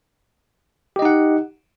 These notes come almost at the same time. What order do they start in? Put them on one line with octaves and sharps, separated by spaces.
G4 D#5 D#4 F#5